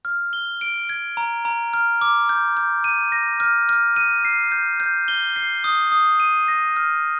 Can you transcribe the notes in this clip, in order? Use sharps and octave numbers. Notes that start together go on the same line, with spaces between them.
F6
G7
D7
G#6
A#5
A#5
F6
D6
G6
G6
D#7
A#6
F6
F6
D#7
C7
G6
G6
G7
C7
D#6
D#6
D#7
A#6
F6